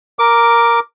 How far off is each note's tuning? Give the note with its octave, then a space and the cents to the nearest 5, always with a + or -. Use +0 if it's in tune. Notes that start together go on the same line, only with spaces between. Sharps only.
A#4 +0 D6 +0